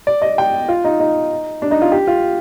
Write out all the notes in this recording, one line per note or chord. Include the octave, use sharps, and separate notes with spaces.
D5
D#5
G5
F4
D#4
D#4
D4
D#4
F4
G4
F4